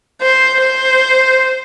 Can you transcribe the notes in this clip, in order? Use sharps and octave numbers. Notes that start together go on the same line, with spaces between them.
C5
C5